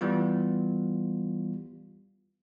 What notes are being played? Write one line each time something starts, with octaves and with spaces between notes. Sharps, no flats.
E3 G3 B3 F4